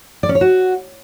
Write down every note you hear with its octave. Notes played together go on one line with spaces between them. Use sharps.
D5
C#4
C#5
F#4